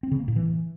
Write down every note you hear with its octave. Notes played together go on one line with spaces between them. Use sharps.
C4
C#3
A#3
A2
E3